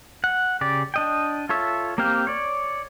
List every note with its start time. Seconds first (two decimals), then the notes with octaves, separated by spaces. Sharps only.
0.24 F#5
0.61 C#3 G4 D5
0.94 D4 D#5 G5
1.49 F4 A4 C#5 E5
1.98 A#3 C4 G4 F5 G5
2.27 C#5 D5